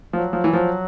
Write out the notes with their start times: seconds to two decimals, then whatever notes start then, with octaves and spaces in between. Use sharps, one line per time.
0.13 F3 F#3
0.33 F3
0.44 E3
0.53 F3 F#3